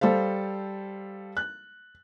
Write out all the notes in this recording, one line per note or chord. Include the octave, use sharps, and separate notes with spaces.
G3 A4 C5 F5
F#6